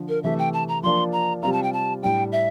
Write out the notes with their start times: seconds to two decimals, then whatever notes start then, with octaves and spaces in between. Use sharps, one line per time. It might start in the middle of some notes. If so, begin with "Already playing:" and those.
Already playing: D3 F3
0.09 A#4
0.23 C3 E3 A3 E5
0.39 G5
0.53 A5
0.69 A#5
0.83 F3 A#3 D4 F4 C6
1.12 A#5
1.42 C3 G3 C4 F4 A#5
1.53 A5
1.63 G5
1.73 A5
2.02 A2 G3 D4 G5
2.32 E5